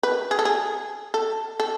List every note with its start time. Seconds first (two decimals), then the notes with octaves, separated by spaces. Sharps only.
0.03 B4
0.31 G#4
0.39 A4
0.45 G#4
1.14 A4
1.60 A4